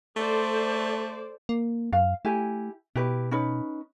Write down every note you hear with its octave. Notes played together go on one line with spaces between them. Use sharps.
A3 A4 C5 D5
A#3
F#2 F5
A3 E4 G4 G#5
B2 E4 G4 B4
C#4 D#4 B4